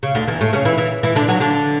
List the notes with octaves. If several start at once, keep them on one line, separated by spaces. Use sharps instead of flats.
C#3
D2 D3
E2 E3
A2 A3
C#3 C#4
E3 E4
E3 E4
E3 E4
D3 D4
F#3 F#4
D3 D4